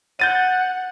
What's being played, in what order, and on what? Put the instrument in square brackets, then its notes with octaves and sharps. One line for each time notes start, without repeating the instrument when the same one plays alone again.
[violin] F#5 [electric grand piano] G6 A6 D#7